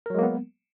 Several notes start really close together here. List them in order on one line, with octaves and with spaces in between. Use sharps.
A#4 F#3 G#3 A#3 B3